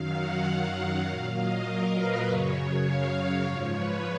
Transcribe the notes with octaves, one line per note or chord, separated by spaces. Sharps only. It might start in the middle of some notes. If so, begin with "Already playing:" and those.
Already playing: F#2 D#3 F#3 F5
F#5
F5
F5
A#2 F#3 F5
D#5
A#4
B4
F#2 C#3 F#3 C#5
F5
G#2 F3 C#5
B4